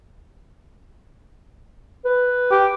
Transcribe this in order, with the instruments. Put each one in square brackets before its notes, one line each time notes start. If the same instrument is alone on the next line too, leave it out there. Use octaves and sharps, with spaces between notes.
[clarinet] B4
[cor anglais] G4